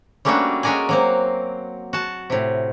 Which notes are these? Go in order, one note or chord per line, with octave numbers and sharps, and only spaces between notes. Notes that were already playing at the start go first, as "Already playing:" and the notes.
G3 A3 A#3 C#4 D4 F#4
G#3 C#4 F#4 A#4 D5 G#5
F#3 A#3 C4
F#4 A5
A2 C3